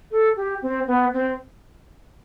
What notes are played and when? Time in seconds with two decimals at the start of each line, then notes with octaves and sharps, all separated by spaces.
0.11 A4
0.36 G4
0.62 C4
0.87 B3
1.14 C4